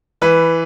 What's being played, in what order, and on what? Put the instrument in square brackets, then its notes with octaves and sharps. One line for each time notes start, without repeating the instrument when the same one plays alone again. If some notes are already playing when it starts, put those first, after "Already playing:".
[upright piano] E3 B4